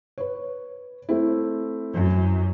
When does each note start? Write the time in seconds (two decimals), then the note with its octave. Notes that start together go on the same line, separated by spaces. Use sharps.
0.18 B4 C#5
1.09 A3 C4 E4
1.94 F#2